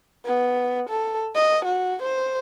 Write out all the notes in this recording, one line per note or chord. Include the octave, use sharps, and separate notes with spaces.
B3
A4
D#5
F#4
C5